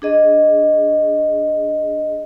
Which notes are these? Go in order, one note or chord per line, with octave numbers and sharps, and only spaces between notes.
D4 G#4 D#5